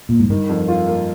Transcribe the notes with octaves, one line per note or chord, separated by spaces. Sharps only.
A#2
G#2
G2 D#3
F2
F4
A#3